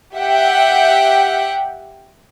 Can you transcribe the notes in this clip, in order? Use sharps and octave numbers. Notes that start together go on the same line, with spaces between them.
G4 E5 F#5 G5